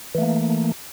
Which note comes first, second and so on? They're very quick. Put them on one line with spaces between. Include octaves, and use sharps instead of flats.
E3 A3 A#3